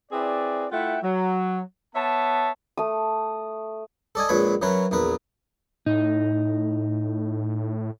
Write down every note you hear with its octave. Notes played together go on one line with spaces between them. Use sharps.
C4 E4 G#4 B4 D5
A3 E4 F4 E5 F#5 G5
F#3
B3 C#5 E5 A5
A3 D#6
A4 D5 D#5 G#5
A#1 A#2 G#3 B4 C#5 B5
E3 F#3 C#4 A#4 B4
A#1 E2 A#4 B4
A2 D#4